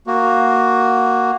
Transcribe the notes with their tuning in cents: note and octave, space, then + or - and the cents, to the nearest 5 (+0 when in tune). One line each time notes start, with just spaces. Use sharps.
A#3 +0 F#4 +0